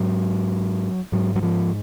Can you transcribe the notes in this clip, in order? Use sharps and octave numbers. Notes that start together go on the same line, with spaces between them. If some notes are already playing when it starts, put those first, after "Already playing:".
Already playing: G#2 F#3
G#2 F#3
F#3
F3